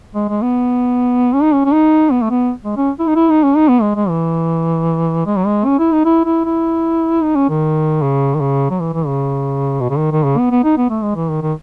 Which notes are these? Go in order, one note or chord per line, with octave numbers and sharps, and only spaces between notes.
G#3
G#3
B3
C#4
D#4
C#4
C#4
D#4
B3
A3
B3
G#3
C#4
E4
D#4
E4
D#4
C#4
D#4
B3
G#3
G#3
E3
G#3
F#3
G#3
C#4
E4
D#4
E4
E4
E4
D#4
C#4
D#3
C#3
D#3
C#3
F#3
E3
E3
C#3
B2
C#3
D#3
D#3
C#3
B3
B3
D#4
B3
A3
G#3
E3
D#3
D#3